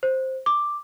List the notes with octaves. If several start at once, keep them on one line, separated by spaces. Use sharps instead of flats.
C5
D6